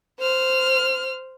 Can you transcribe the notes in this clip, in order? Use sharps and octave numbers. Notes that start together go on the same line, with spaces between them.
C5 F6